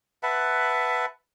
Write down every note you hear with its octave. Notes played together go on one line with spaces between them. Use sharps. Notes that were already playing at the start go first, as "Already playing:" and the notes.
B4 E5 F#5 A5